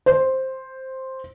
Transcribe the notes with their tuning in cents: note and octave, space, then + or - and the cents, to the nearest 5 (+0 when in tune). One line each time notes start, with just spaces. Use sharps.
C5 +5